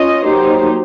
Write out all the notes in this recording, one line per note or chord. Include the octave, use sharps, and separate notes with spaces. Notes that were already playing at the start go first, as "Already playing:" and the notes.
Already playing: C#4 F4 D#5
F#3 A#3 D#4 G4 C5